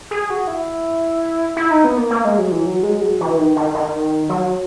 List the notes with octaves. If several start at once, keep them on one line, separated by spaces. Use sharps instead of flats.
G#4
F#4
E4
E4
D#4
B3
A#3
A#3
G#3
F#3
E3
F#3
G#3
F#3
E3
D#3
D#3
D#3
F#3